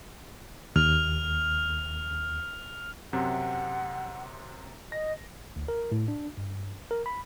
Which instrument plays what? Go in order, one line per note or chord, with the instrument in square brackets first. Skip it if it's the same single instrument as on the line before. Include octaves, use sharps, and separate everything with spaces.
[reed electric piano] D#2 [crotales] F6 F7
[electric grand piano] F#2 C3 C4 [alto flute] F#5
[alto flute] D#5 [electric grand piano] A#6
[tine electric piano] D2
A#4
A2
D4
G2
A#4
B5